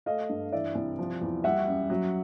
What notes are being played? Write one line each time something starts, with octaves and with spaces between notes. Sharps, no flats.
A3 D#5 F5
G2
E3 D5 E5
C2
F3
E2
G3 E5 F#5
F#2
F#3